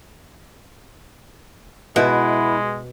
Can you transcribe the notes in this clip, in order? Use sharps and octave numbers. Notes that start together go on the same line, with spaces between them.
B2 G#3 E4 B4